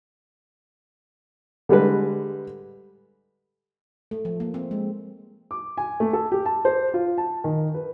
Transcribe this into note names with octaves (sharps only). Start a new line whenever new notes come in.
D3 G3 G#3 B4
A3
F3
A#3
C4
G#3
D6
G#5
A3
A4
G4
A5
C5
F4
A5
D#3
B4